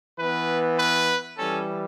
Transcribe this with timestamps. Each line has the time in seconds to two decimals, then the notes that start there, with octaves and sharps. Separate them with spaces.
0.18 E3 B3 B4
0.77 B4
1.37 E3 G3 C#4 A4